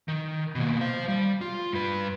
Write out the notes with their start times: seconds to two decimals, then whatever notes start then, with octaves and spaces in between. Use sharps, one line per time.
0.08 D#3
0.55 B2 A#3
0.81 C5 F5
1.08 G3
1.41 F4
1.73 G2 B4